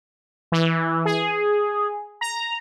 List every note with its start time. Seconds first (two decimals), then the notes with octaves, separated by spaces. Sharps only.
0.52 E3
1.05 G#4
2.21 A#5